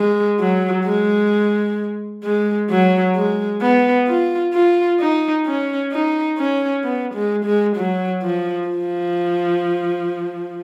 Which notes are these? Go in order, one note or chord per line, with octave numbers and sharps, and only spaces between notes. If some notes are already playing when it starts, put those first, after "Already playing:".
Already playing: G#3
F#3
G#3
G#3
F#3
G#3
B3
F4
F4
D#4
C#4
D#4
C#4
B3
G#3
G#3
F#3
F3
F3